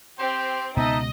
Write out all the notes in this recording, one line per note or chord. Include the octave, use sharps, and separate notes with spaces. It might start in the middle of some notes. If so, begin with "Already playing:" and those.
C4 G4 C5
C#2 B2 B3 D#4 A4 D#5 E5